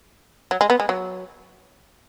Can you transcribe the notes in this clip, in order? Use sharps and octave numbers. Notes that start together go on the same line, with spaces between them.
F#3
G#3
B3
G#3
F#3